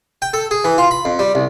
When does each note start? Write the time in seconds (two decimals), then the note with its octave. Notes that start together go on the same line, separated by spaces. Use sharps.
0.22 G5
0.33 A4
0.51 G#4
0.64 E3
0.78 F4
0.91 B5
1.05 F2
1.19 G3
1.35 C2